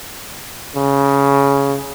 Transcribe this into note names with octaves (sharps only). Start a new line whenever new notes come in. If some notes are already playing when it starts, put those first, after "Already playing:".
C#3